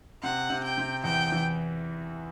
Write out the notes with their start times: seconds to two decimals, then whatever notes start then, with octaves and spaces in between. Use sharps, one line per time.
0.23 C3 F#5
0.50 C3
0.64 G5
0.78 C3
1.04 E2 G5
1.32 E3